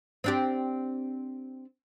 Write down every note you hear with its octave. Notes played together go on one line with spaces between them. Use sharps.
C4 D4 G4